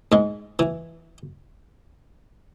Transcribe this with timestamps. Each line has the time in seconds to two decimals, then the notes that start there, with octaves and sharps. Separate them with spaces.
0.12 G#2 G#3
0.59 E3